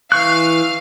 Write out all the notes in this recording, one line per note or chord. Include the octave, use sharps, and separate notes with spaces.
E3 F5 C#6 F6 F#6 C7